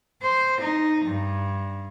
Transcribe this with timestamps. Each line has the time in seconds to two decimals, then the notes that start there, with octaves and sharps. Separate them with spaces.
0.22 C5
0.60 D#4
1.05 G2